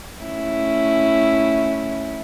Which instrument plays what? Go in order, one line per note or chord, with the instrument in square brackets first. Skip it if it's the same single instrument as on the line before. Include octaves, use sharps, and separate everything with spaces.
[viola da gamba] A3 C#4 E4